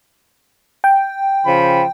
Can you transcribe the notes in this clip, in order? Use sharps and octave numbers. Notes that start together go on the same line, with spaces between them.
G5
C#3 F3 B5